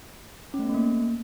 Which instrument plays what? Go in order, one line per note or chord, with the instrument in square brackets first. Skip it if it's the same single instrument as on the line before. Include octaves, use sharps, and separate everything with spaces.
[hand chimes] C#4
A3
B3
A3
A#3